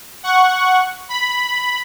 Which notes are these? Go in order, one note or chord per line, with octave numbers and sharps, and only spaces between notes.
F#5 C#6
B5